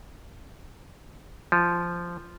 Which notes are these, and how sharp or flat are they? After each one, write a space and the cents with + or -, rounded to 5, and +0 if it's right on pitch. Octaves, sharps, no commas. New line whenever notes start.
F3 -10